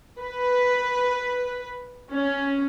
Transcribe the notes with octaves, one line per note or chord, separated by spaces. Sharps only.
B4
C#4